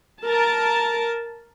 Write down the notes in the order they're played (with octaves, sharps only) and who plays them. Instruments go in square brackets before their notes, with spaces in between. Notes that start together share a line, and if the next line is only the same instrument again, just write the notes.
[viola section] A#4 A5